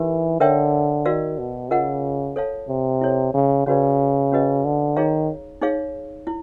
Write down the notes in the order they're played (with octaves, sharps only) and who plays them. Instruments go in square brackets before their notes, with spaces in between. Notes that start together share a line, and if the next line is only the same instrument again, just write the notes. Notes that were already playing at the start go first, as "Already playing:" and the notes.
Already playing: [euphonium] E3 [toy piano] D#4 G4 A#4
[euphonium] D3 [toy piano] A#4 C#5 E5 G5
[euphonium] D#3 [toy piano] F#4 A#4 D5 F5
[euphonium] B2
[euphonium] C#3 [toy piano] F4 A#4 D#5 F#5
[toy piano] A4 C#5 F5 A5
[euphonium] C3
[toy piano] E4 A4 C#5
[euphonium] C#3
[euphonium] C#3 [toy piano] C#4 F#4 B4 D5
[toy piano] C#4 F#4 B4 D#5
[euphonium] D3
[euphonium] D#3 [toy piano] D#4 G#4 C#5 F5 A#5
[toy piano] D#4 G#4 C#5 F5
E4